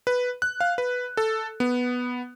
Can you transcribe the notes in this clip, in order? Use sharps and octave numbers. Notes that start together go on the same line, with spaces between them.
B4
F#6
F5
B4
A4
B3